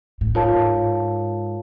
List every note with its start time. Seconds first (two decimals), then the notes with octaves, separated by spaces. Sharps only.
0.21 A2
0.35 G#2 F4 A#4 C#5 F5 A5